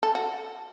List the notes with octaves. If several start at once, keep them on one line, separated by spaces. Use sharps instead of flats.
A4
F#4